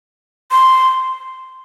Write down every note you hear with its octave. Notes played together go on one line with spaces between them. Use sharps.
C6